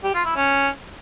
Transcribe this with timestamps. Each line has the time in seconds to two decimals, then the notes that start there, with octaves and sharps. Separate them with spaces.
0.04 G4
0.15 F4
0.25 E4
0.36 C#4